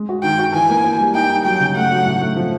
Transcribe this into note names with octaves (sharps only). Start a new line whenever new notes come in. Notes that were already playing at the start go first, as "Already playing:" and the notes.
Already playing: G#3
F#4
D#3 G5
F#4
E3 G#5
A#3
A#3
G3
D#4 G5
D#4
F#3 G5
C#3
A3 F#5
F#3
A2
A3
F3